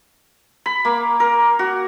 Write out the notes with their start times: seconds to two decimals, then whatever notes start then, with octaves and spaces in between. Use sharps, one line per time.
0.66 B5
0.85 A#3
1.20 A#4
1.59 F#4